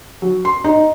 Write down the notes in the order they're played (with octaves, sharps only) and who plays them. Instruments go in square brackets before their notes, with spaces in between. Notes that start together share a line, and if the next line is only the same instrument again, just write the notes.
[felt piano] F#3
C6
D#4